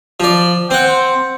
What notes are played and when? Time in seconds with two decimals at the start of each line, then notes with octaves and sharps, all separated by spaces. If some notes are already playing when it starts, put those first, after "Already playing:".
0.20 F3 D5
0.70 C4 F#5 G5
0.88 C5